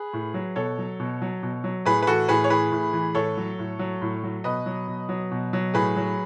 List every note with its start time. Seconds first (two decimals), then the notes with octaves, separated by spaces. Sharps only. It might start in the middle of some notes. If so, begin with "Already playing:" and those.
Already playing: G#4 B4
0.13 A2
0.34 F#3
0.56 B2 A4 C#5
0.78 F#3
1.00 B2
1.22 F#3
1.43 B2
1.64 F#3
1.86 A2 G#4 B4
2.02 B4
2.07 E3 F#4 A4
2.28 A2 G#4 B4
2.44 C#5
2.50 E3 G#4 B4
2.72 A2
2.93 E3
3.15 A2 A4 C#5
3.37 F#3
3.59 A2
3.79 F#3
4.02 A2
4.23 F#3
4.44 B2 B4 D#5
4.66 F#3
4.88 B2
5.09 F#3
5.31 B2
5.53 F#3
5.74 A2 G#4 B4
5.96 F#3